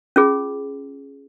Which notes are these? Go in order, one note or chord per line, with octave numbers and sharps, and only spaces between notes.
C#4 F4 G#4